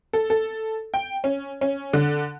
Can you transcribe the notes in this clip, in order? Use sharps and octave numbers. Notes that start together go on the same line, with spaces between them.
A4
A4
G5
C#4
C#4
D3